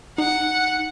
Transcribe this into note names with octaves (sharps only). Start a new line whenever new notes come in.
D#4 F#5